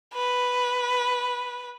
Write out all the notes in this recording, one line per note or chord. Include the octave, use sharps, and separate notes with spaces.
B4